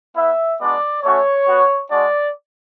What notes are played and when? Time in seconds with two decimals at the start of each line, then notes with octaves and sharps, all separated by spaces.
0.16 B3 E4 E5
0.60 G#3 B3 D4 F#4 D5
1.04 A3 C#4 F#4 C#5
1.47 B3 F#4
1.91 G#3 D4 F#4 D5